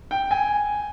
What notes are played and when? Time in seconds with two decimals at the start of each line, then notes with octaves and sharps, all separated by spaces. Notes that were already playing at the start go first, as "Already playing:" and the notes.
0.11 G5
0.31 G#5